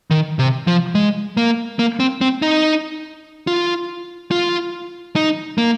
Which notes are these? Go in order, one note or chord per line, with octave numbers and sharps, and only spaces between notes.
D#3
C3
F3
G#3
A#3
A#3
C4
C4
D#4
F4
F4
D#4
A#3